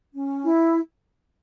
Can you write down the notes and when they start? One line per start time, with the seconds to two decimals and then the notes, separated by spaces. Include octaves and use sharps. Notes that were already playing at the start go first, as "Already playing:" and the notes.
0.13 C#4
0.44 E4